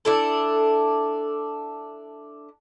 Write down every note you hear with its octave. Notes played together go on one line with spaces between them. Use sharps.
D4 E4 A4